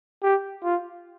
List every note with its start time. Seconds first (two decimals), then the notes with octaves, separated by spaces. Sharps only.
0.23 G4
0.63 F4